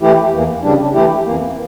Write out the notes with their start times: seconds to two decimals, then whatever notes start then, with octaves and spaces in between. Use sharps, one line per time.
0.01 E3 A3 E4 G4
0.32 E2 E3 A#3
0.63 C#3 G3 D4
0.94 E3 A3 E4 G4
1.25 F2 E3 A#3